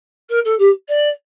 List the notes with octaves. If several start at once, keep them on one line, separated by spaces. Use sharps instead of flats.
A#4
A4
G4
D5